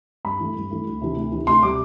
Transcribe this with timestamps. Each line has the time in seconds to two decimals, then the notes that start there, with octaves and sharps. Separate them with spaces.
0.25 G2 B5
0.40 E3 A3
0.55 G2
0.70 E3 A3
0.86 D2
1.01 C3 E3
1.17 D2
1.32 C3 E3
1.47 D2 C6
1.63 C3 G3 D6